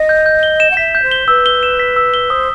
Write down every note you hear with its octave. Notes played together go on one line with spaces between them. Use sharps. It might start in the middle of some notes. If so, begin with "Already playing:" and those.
Already playing: D#5
G6
G6
G7
E7
F#5
E5 B6
G6
C5
G7
B4 E6
G7
E7
B6
E6
G7
C5 D#6